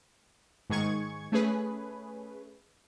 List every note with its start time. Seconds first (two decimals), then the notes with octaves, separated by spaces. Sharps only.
0.70 G#2 D#3 G#4 C#6 G#6
1.32 A3 C#4 G#4 B4